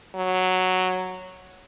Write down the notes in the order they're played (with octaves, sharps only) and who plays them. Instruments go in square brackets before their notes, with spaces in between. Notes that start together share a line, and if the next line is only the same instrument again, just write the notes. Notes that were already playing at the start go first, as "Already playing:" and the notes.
[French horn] F#3